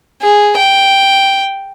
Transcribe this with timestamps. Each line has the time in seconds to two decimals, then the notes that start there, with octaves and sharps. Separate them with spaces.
0.22 G#4
0.57 G5